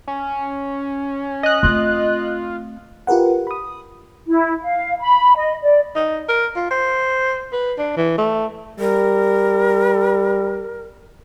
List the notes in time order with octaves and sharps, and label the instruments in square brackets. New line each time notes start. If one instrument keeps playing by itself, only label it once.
[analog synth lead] C#4
[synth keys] D#5 F#6
[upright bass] A3 C4 [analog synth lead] F4
[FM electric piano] F4 G4 A#4 B4 F#5
B5 D#6
[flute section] E4
F5
B5
D#5
D5
[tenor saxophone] D#4
A#4
F4
C5
B4
D4
E3
A3
[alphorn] G3 [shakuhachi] A#4